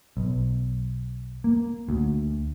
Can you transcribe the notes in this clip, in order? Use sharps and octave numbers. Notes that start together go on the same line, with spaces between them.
B1
A#3
D2